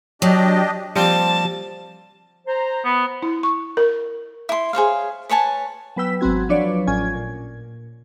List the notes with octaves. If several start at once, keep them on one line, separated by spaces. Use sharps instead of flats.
F#3 D4 G4 D#5
F3 G3 A#3 C4 A5
C5 A#5
B3
E4
C#6
A#4
E4 C6
G#4 C5 C#5 F5
B4 C#5 G#5 A5
F#3 B3 B4 G5 E6 B6
G#1 F#3 B3 C4 F#4 G#6
F3 F#3 D4 B4 C#5 D5
A1 A2 C#4 F4 G#5 G#6
A#2